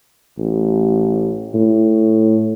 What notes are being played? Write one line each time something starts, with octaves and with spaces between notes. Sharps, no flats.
A1
A2